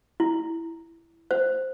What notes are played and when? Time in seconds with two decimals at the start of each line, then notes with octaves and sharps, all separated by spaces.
0.20 E4
1.31 C5